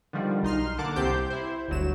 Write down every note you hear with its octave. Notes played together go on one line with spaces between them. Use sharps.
D3 D#3 F3 G3
B1 D#4 C6 F6
D3 A#3 F#5 A5 D6
C2 C4 G4 C5 G6
E4 C5
G1 D2 F#3 E7